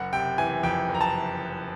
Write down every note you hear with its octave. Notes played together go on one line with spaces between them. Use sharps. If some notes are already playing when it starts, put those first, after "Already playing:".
Already playing: F#1 F#5
C3 G5
E3 G#5
F2 G5
F#1
A#5
A5